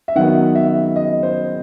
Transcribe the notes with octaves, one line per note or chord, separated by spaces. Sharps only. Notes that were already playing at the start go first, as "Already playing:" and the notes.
E5
D#3 F#3 B3 F#5
E5
D#5
C5